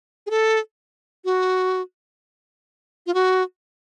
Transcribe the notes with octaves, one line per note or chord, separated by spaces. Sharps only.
G#4
A4
F#4
F4
F#4